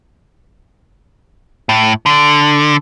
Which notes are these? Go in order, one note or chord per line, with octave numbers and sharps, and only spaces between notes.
A2
D3